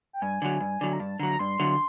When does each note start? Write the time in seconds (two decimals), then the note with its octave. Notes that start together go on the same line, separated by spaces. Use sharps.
0.13 G5
0.22 G2 G#5
0.42 D3 F#3
0.60 G2
0.81 D3 F#3
0.93 A#5
1.00 G2 A5
1.19 D3 F#3 A#5
1.39 G2 C6
1.59 D3 F#3